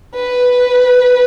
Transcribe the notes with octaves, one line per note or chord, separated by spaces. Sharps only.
B4